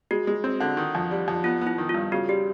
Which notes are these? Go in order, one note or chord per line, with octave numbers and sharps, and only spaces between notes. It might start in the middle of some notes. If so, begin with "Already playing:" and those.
G#3 F#4
G#3
C4
D3
D#3
F2
G3
F2
B3 F4
B3
E4
D#3
F4
G2
C#3 F#4
G3 G4